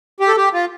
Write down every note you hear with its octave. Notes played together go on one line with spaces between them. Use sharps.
G4
A4
G4
F4